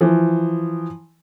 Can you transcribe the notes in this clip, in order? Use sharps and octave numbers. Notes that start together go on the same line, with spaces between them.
E3 F3